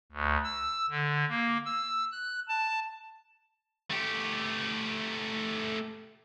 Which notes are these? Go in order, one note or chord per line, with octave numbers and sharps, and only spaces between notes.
D2
E6
D3
A#3
E6
F#6
A5
A3 G4